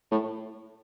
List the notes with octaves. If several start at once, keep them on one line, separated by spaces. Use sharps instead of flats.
A2